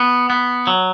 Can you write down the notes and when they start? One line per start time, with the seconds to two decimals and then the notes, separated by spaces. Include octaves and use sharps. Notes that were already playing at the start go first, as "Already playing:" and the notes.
Already playing: B3
0.30 B3
0.67 F#3